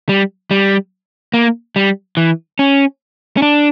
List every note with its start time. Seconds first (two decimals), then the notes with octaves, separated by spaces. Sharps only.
0.09 G3
0.51 G3
1.34 A#3
1.76 G3
2.17 E3
2.59 C#4
3.37 C#4
3.42 D4